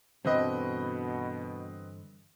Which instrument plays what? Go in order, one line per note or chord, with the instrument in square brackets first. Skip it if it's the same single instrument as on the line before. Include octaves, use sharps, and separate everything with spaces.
[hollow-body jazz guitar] G2 D3 E3 [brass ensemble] B2 [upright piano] C4 B4 D#5